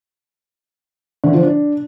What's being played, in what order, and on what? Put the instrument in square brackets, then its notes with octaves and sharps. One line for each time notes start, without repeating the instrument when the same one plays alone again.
[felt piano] D3
F3
D4